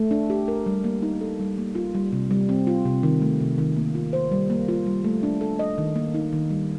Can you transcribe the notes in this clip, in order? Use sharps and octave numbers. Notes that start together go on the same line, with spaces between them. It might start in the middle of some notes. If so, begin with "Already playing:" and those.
Already playing: A3
D4
G4
A#4
G3
A#3
D#4
A4
G3
A#3
F4
G3
C3
G3
C4
F4
C3
D#3
A3
C3
D#3
A#3
F4
C5
G3
A#3
F4
G3
A3
D4
A4
D#5
D#3
A#3
D#4
D#3
G3